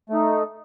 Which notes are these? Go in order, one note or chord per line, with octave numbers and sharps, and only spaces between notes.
A3 D#4